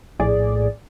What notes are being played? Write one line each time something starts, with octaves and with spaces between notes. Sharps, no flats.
A#1 A2 G#4 D5